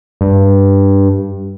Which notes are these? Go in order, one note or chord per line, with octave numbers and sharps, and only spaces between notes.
G2